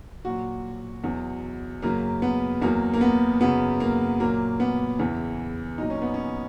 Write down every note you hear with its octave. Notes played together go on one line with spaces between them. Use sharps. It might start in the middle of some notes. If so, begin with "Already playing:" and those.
A#2 F#3 F#4
E2 B2 F#3
F#2 C#3 F#3 A#3
B3
E2 B2 F#3 A#3
A#3
B3
F#2 C#3 F#3 B3
A#3
A#2 F#3 A#3
B3
E2 C#3 E3
A#2 F#3 D#4
C#4
B3
C#4